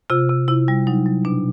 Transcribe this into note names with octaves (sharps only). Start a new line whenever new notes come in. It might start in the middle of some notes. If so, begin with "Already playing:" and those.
C3 F4
C3
C3 E4
G3
F#3 D#4
F#3
B2 D4